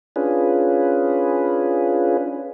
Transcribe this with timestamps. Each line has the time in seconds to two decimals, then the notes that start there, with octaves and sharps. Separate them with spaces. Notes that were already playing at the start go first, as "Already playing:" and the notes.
0.16 C#4 D4 F4 G#4 B4